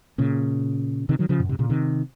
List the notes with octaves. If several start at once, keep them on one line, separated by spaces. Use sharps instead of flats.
A#2 C#3
C3 D#3
D#3 F#3
C#3 F3
F#2 A#2
G#2 C3
A#2 C#3
C3 D#3